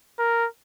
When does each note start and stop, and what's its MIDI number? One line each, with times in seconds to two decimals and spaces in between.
0.19 0.47 70